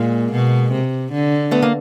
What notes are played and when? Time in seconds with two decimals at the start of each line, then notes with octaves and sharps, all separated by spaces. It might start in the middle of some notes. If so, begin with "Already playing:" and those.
Already playing: A#2 G#3 A#3
0.33 B2
0.72 C3
1.12 D3
1.51 A3 B3
1.62 A#3